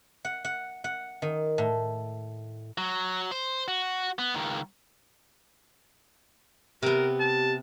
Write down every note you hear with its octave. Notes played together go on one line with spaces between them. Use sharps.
F#5
F#5
F#5
D#3
A2
F#3
C5
F#4
B3
C#2 D#3
C3 B3 G4 A#4
A5